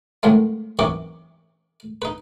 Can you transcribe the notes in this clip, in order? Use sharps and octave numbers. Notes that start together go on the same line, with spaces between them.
A2 C3 D#3 F#3 G#3 A3
F#2 C3 E3 D#4 C#5 D6
D#4 B4